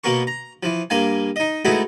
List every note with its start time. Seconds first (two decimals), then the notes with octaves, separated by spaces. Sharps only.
0.04 B2 A#3 B3 A#4 C#6
0.27 A#5
0.63 E3 F3
0.90 G2 A#3 F5 G#5
1.36 D#4 D#5
1.65 G#3 A3 B3 D#4 E4 F#4